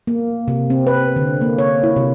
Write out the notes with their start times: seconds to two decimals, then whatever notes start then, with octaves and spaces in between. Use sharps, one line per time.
0.07 A#3
0.48 C3
0.70 C4
0.87 B4
1.16 D3
1.41 A#3
1.58 C#5
1.83 E4
1.96 C3